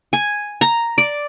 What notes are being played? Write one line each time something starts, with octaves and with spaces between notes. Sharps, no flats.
G#5
A#5
D5